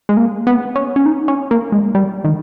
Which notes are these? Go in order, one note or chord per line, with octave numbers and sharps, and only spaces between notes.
G#3
A#3
B3
C#4
C#4
D#4
C#4
A#3
G#3
G3
D#3